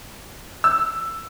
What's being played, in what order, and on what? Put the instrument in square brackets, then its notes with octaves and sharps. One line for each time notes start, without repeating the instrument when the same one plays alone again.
[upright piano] E6